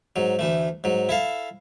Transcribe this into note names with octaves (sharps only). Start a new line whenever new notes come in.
G#2 F#3
D2 E3 A3
G#2 F#3
E4 A4 F5